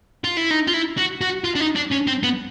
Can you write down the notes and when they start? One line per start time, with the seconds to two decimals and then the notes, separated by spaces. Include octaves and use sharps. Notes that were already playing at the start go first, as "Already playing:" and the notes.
0.24 F4
0.37 E4
0.51 D#4
0.67 F4
0.73 E4
0.98 F#4
1.21 F#4
1.44 F4
1.55 D4
1.61 D#4
1.76 D4
1.92 C#4
2.07 C4
2.23 B3